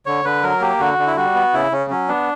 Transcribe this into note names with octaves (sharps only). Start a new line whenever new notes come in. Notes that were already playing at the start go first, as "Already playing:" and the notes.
D3 C#5
D3 B4
F#3 A#4
A#3 G4
D3 F#4
D3
E4
G3 F#4
B3
C#3 E4
C#3 C#4
F#3 C#4
B3 D4